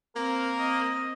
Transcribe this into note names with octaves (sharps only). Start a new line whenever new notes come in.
A#3 C4 A#4
C4 D#5